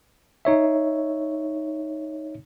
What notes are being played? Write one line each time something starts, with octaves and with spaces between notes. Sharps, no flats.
D#4 C#5 E5